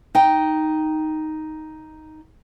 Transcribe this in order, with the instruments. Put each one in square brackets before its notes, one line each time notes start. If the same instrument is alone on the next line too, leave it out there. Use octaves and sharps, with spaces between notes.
[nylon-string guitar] D#4 G5